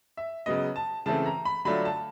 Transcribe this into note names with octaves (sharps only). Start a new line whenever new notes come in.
E5
C#3 F#3 B3 D#5
A5
C#3 E3 A3 C4 A5
A#5
B5
D3 F#3 A3 D4 F4 B5
A5